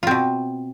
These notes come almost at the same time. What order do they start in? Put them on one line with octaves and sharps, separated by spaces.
F4 C4 B2